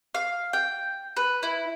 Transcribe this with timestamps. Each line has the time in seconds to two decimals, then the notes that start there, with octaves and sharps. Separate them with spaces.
0.14 F5
0.53 G5
1.16 B4
1.43 E4